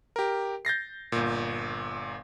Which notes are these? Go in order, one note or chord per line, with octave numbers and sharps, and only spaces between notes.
G4 A#4
G6 A6 A#6 C7
G1 A#2